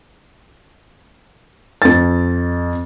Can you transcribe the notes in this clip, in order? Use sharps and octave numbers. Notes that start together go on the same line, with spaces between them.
F2 A6